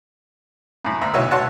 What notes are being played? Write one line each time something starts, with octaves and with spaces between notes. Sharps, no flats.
F#2 A2
D2 E5 A#5
B1 E4 F#4 B4 C#5 E6
F#4 C#5 F#5 A5 C6